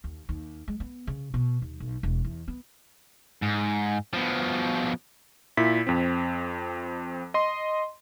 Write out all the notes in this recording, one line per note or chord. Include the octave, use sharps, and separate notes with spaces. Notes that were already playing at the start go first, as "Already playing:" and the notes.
D#2
D#2
G#3
B3
C#3
B2
D#2
B1
E1
E2
B3
G#2
B2 F3
A#2 E4 B6
F2 C4
D#5 C6